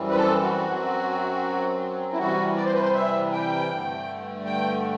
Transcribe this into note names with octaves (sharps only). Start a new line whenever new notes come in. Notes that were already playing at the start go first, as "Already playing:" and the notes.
Already playing: F#2 E3 G3 C4
B4
A4
F#4
F#2 F#3 C4
E4
C3 E3 G3 F#4
D5
C5
B4
C5
E5
G5
G2 D3 A3
G5